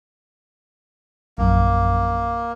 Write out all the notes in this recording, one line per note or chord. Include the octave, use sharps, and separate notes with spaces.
A#1 F#2 A#3